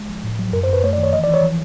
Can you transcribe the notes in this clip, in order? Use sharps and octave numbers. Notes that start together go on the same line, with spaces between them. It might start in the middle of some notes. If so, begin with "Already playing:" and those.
Already playing: G#3
F3
A2
F#3
F#2 A#4
C5
F#2
B4
A3 C#5
D5
D#3
C#5
E3 D#5
D5
E3
C#5
F3